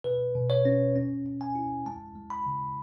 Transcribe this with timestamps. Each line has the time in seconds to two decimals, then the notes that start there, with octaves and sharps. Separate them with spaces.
0.04 B2 B4
0.35 B2
0.50 C#5
0.65 C#4
0.96 C#4
1.26 C#4
1.41 G#5
1.55 E4
1.86 G#3 A5
2.16 G#3
2.30 B5
2.46 C#3